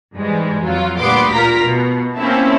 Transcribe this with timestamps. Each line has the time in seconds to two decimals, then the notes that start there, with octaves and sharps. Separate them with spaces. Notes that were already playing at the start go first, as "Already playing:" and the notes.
0.15 G#2 E3 G3 G#3
0.63 F2 F#3 F4
0.98 D2 A#2 G3 B3 C6 D6
1.30 A#2 F4 A#4 A#5 B6
1.64 B2
2.16 A#3 C4 C#4 E4 E5 A5